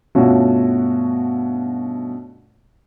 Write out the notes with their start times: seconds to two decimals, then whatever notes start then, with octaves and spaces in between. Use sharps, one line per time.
0.15 G2 B2 A3 C#4 F4 F#4